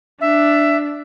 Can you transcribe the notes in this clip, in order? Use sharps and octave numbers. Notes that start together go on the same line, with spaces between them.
D4 E5